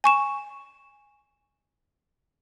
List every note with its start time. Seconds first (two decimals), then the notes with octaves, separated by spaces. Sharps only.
0.04 G#5 C#6 E7